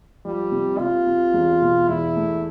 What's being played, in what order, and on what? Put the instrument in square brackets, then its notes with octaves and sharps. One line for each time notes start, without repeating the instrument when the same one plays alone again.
[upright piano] F3 [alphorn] G3
[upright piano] C3
[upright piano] C3 [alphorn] F4
[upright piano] C3
E2
B2
[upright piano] E2 [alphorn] E4
[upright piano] A3